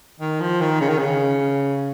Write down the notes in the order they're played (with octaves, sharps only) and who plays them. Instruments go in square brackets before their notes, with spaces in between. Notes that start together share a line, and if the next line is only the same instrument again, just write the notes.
[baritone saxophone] D#3
F3
D#3
C#3
D#3
C#3